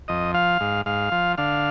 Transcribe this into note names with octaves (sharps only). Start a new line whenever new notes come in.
F2 D#5
F3 F5
G#2
G#2 F5
F3
D3 F5